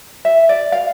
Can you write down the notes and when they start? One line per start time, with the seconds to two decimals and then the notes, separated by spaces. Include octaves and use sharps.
0.25 E5
0.49 D5
0.72 F5